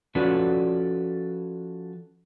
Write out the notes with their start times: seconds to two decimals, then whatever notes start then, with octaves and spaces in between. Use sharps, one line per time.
0.15 F3 C#4 F#4 A4 B4 D5